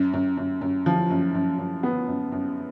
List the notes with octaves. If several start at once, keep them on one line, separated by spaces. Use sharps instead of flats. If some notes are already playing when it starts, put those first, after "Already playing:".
Already playing: F#2
F#2
F#2
F#2
F3
F#2
F#2
F#2
B3
F#2
F#2